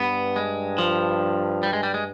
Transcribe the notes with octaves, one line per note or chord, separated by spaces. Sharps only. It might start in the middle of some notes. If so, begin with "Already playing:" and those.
Already playing: G2 B3
G#3
F3
G3
G#3
G3
G#3